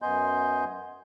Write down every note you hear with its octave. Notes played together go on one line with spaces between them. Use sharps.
F#2 B3 D#5 G#5 C6 G6